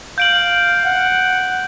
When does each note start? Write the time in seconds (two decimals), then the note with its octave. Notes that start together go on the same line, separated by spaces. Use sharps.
0.18 F5 G6 D7 F#7
0.85 F#5